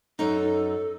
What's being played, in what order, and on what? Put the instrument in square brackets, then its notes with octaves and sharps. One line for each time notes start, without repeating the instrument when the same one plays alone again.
[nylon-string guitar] F#2 D#4 [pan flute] A4